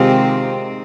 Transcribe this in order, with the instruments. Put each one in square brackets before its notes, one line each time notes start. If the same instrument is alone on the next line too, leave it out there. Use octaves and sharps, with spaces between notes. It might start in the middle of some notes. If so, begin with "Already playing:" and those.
Already playing: [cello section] C3 D#3 G#3 C4 F4 G4